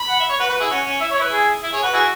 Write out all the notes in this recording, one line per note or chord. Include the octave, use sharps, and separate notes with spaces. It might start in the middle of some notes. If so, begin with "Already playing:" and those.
Already playing: B5
F#5
E5
C#5
F#4 B4
F#4 B4
E4 G#4
C#4 F#4
C#4
E4 E5
C#5
E4 B4
G#4
E4
G#4 C#5
F#4 B4
E4 F#4 G#4